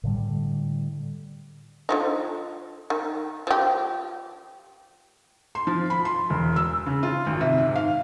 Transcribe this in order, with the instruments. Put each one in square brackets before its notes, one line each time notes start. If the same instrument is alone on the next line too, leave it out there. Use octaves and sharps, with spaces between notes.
[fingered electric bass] A2 D3 G3
[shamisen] D3 F3 D#4
D#3
F3 G4
[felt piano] C6
F3
B5
C6
E1
E6
C#3
F4
G#1
C3
G#2
F5